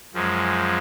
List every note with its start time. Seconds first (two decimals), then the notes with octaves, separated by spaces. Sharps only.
0.14 F#2 F3 G#3